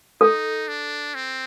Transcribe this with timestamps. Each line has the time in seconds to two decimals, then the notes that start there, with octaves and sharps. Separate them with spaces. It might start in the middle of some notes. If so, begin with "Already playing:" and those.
0.21 D#4 A4
0.68 D4
1.15 C4